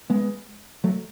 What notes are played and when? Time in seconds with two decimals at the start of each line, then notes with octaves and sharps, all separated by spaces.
0.10 G#3 B3
0.84 F#3 A3